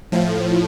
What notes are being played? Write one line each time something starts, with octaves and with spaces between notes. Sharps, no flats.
A2 F3